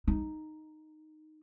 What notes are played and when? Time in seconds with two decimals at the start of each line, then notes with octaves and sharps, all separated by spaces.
0.08 D#4